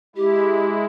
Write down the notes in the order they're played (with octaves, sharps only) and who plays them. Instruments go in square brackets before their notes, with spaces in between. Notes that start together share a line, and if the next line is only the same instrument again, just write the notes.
[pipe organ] G#3 E4 [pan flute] G4